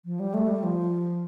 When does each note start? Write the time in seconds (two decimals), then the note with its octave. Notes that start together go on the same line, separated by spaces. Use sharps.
0.05 F3
0.20 G3
0.34 A3
0.48 G3
0.63 F3